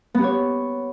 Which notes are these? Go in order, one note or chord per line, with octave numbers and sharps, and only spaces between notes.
B3 G4 C#5